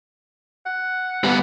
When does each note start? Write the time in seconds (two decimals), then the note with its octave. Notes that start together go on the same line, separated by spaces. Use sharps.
0.66 F#5
1.24 G3 B3